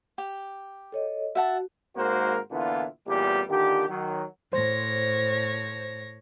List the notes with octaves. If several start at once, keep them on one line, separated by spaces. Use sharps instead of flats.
G4
A4 C#5 D#5
F#4 E5 F#5 A5
G#1 G#2 A#3 F#4 A#4 C5
A#2 D3 E3 B3 E4 F4
A1 E2 A#2 G3 G4
A#2 D3 D#3 G4
D#3 F#3
A2 C5 C#5 A#6